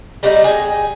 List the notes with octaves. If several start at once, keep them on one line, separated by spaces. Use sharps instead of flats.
G3 A3 D4 D#4
G#4 G5